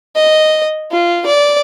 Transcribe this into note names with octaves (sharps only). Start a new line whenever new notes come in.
D#5
F4
D5